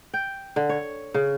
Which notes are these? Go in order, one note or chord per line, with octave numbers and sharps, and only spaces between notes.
G5
D3
C#5
C#3